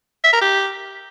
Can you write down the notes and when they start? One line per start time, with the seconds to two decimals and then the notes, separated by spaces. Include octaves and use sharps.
0.24 E5
0.33 A#4
0.41 G4